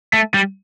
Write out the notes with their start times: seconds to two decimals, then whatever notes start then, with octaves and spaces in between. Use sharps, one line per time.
0.13 A3
0.34 G3